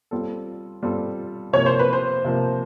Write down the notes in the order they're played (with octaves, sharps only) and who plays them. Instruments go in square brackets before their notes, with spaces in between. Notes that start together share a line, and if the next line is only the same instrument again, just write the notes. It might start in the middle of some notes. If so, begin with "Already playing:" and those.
[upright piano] G3 C4 F4 A4
G3 C4 F4 A4
[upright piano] C3 F3 A#3 [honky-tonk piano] C#5
[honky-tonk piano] C5
B4
C5
[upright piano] C3 F3 A#3